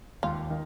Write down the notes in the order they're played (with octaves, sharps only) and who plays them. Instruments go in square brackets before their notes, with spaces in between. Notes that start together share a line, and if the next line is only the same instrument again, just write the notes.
[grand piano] D#2 [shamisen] F4
[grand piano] D#3